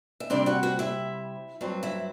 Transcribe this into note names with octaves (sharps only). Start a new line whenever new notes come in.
E5
C3 G3 C4 D4 D5
F#4 F#5
F#4 F#5
E4 E5
G2 F#3 C4
E4 E5